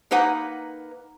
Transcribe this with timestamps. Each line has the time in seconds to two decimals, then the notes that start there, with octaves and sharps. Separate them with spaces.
0.11 A#3 D#4 B4 F#5